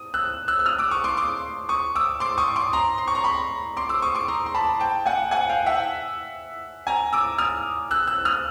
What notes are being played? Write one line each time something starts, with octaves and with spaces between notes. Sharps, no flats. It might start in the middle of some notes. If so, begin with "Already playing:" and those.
Already playing: D#6
E6 F#6
E6 F#6
E6
D#6 F6
D6 E6
C#6 D#6
C6 D6
C6 D6
C#6 D#6
D6 E6
C6 D6
C#6 D#6
C6 D6
A#5 C6
C6
C#6
A#5 C6
B5 C#6
C6 D6
D6 E6
C#6 D#6
C6 D6
A#5 C6
C6
A5 B5
G5 A5
F#5 G#5
F#5 G#5
F5 G5
E5 F#5
G#5 A#5
D6 E6
D#6 F6
E6 F#6
E6 F#6
D#6 F6